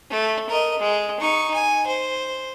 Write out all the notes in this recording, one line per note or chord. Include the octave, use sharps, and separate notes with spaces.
A3
A#4 D#5
G#3
D#4 C#6
G#5
C5